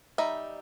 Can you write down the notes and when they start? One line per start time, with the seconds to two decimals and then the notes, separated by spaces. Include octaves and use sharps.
0.18 G3 D#4 E5